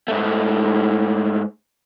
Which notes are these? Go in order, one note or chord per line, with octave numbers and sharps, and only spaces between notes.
G#2 A3